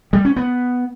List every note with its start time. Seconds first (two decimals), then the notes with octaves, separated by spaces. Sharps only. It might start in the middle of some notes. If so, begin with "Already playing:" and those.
0.13 G3
0.25 C#4
0.36 B3